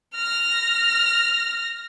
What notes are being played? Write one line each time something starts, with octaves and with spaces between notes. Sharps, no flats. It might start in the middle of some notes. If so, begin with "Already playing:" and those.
F6 A#6